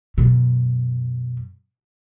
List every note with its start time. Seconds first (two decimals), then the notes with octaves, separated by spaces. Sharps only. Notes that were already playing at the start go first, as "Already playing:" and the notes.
0.18 F#2 B2